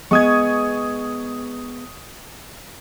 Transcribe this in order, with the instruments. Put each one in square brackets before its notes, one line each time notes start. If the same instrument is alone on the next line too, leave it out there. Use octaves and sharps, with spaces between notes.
[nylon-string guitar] G#3 B3 [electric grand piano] C#6 D#6 G#6